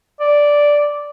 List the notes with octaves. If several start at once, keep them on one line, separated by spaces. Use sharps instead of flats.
D5